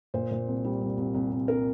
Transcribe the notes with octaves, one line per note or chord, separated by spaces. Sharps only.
A#2 C5
A#2
C2
G3
C2
C2
C2
C2
C2 A#4